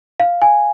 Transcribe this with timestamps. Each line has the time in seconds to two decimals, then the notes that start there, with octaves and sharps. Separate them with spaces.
0.20 F5
0.42 G#5